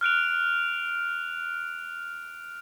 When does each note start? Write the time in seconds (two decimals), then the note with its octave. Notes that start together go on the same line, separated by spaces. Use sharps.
0.01 F6 F#6 D7 F7